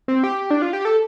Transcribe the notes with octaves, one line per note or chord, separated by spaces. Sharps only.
C4
G4
D4
F4
G4
A4